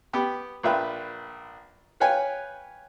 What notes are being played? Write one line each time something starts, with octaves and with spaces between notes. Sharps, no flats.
B3 G4 B5
A#1 F4 B4 E5 G5 B5
B4 C#5 F5 G5 G#5